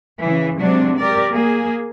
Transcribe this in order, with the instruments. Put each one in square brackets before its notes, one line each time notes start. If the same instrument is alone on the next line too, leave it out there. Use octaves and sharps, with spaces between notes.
[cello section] C#3 E3
C3 F#3 G#3 C4 D4
G4 A#4 D5
A#3 G#4